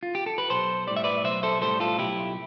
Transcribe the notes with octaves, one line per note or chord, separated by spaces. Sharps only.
F4
G4
A4
B4
B1 A4 C5
A2 G3 D5
E5
B4 D5
B1 C5 E5
A4 C5
A2 G3 A4 C5
F4 A4
B1 E4 G4